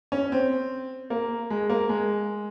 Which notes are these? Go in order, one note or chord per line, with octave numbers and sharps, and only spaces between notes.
C#4
C4
A#3
G#3
A#3
G#3